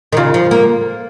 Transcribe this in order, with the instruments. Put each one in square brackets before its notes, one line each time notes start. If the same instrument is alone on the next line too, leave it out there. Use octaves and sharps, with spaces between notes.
[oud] D#3
[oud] C#3 [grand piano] F4
[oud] F3
A#3